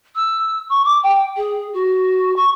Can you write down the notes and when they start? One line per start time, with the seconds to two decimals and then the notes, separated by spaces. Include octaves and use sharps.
0.15 E6
0.69 C#6
0.84 D6
1.03 G5
1.36 G#4
1.73 F#4
2.36 C#6